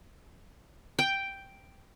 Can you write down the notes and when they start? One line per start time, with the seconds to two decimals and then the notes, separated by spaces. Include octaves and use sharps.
0.99 G5